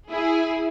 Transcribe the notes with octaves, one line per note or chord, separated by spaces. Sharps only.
E4 G#4